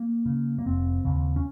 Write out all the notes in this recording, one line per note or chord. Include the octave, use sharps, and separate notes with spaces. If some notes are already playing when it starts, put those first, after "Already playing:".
Already playing: A#3
C#3
A#3
F1 C4
D#2 C#3
C#4